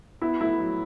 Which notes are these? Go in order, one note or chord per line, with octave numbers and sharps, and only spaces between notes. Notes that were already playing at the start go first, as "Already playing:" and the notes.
B3 E4
A2 E4
F#3